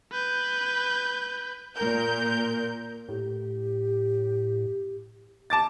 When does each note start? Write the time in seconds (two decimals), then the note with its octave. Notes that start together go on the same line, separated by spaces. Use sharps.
0.12 B4 G6
1.75 A#2 A#4 G6
3.09 A2 G4
5.50 A5 D6 A6